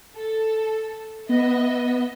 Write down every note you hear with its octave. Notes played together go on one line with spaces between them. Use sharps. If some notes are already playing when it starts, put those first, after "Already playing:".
A4
B3 D#5 E5